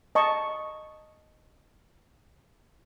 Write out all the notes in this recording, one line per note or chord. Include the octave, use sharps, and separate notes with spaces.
D#5 A5 C#6